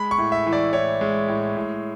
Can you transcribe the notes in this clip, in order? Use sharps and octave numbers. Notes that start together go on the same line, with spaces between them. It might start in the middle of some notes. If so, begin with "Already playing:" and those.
Already playing: G#3 B5
C#6
A2
E5
E3
D5
A2 C#5
G#3
A2
A2